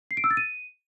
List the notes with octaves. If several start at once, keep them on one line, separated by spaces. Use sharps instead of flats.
C7
D7
E6
A6
D#7